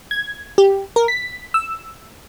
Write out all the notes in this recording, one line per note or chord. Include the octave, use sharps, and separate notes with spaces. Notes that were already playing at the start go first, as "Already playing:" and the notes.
G#6
G4
A#4
B6
E6